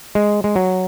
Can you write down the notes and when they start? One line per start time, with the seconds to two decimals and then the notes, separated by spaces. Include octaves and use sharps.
0.15 G#3
0.44 G#3
0.56 F#3